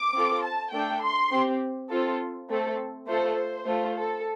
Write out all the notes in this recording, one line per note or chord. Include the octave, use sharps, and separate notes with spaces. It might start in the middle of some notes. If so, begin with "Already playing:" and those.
Already playing: D6
C4 F4 A4
A5
A3 D4 A4 G5
C6
C4 G4
C4 F4 A4
A3 C4 A4
A3 F4 A4 C5
C5
A3 F4 A4
A4